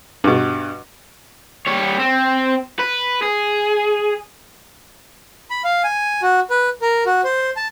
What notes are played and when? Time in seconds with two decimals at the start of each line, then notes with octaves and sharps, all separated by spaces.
0.24 G2 B2
1.67 G3 C#5
1.99 C4
2.79 B4
3.22 G#4
5.50 B5
5.64 F5
5.84 G#5
6.22 F#4
6.50 B4
6.82 A#4
7.06 F#4
7.24 C5
7.56 A5